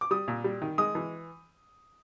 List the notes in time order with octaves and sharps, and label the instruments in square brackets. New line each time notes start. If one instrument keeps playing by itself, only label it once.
[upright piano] D6
[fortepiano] G3 [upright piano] D#6
[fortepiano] A#2
G3
D#3
[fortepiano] G#3 [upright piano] D#6
[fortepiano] E3